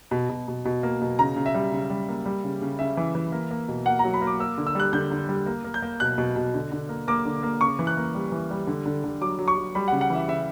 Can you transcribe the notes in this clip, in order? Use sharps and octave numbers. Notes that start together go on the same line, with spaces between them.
B2
B2
B2
B2
A#3
B2
C#3 A#5
C#3
E5
G3
C#3
G3
A#3
G3
C#3
C#3
C#3 E5
E3
E3
A#3
A#3
B2
A#3 F#5
A#5
F#3
B5
A#3
D6
A#3 E6
D3
E6
G3 F#6
D3 G6
D3
G3
A#3
A#3
G6
A#3
B2 F#6
B2
B2
D3
D3
A#3
A#3 D6
D3
A#3
C#3 C#6
E3
F#6
A#3
G3
E3
G3
D3
D3
D3
F#3 D6
F#3
C#6
F#3
G3 B5
F#5
C#3
F#5
E3
E5
C#3 E5